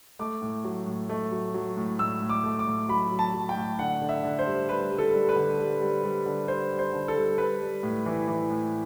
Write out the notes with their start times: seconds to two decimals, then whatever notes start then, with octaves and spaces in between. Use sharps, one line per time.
0.19 A3 D6
0.42 A2
0.64 F#3
0.86 A2
1.09 A3
1.32 F#3
1.54 F#3
1.77 A2
1.99 A2 E6
2.22 A2
2.29 D6
2.44 A3
2.59 D6
2.66 A2
2.89 F#3 B5
3.11 F#3
3.19 A5
3.34 F#3
3.49 G5
3.56 A2
3.79 D3 F#5
4.01 D3
4.09 E5
4.24 D3
4.39 C5
4.46 G3
4.69 G3 B4
4.91 G3
4.99 A4
5.14 G3
5.29 B4
5.36 D3
5.58 G3
5.81 G3
6.04 G3
6.26 D3
6.48 G3 C5
6.71 G3
6.79 C5
6.93 D3
7.08 A4
7.16 G3
7.38 G3 B4
7.61 G3
7.83 A2
8.06 E3
8.28 E3
8.50 A2